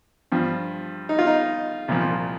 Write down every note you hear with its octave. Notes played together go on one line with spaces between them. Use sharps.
G2 F3
D#4
F4
D#4
C2 A#2 F3